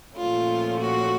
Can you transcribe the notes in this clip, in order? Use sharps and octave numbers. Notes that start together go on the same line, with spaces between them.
A#2 F3 A3 C#4 F4
F#4